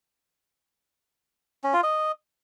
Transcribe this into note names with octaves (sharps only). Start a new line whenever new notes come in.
C#4
F4
D#5